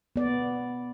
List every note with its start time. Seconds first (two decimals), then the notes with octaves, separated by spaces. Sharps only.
0.16 B3 D5